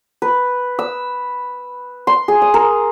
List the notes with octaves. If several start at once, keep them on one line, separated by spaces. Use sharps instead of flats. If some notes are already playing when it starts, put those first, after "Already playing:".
B4
E6
C6
G#4
D#6
A#4